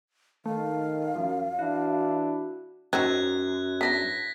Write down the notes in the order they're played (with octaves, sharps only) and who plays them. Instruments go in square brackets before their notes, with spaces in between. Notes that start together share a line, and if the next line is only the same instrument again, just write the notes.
[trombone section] D#3 [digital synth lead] A3 [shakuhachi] F5
[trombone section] F#2 [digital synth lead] F3
[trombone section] E3 D4 E4 [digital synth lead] F#4
[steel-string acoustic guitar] F#2 [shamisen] C4 D#4 F#4 [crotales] F#6 G#6
[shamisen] B3 D4 E4 [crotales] A#6 B6